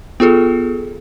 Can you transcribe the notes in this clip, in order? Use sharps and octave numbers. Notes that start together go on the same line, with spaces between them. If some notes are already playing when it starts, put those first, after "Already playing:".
B3 F4 G#4 A4